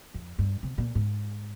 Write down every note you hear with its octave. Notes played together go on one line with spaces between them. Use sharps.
F2
G2
C3
A#2
G#2